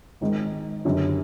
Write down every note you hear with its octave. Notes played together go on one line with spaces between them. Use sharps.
G#1 G#2 D#3 G#3
F#1 F#2 D3 G3